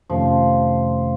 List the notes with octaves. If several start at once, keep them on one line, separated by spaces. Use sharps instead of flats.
F2 C3 D#3 F3 A3 C#4